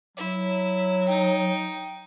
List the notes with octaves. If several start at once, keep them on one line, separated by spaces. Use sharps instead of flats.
F#3 E4
D#4 G5